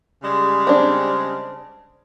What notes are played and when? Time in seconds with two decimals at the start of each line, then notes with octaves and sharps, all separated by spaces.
0.23 C#3 G3 G#3
0.67 C4 D4